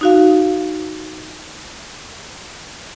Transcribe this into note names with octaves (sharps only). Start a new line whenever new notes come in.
D#4 F#4 F5